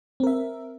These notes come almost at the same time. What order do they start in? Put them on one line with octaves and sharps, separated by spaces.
C4 A#4 E5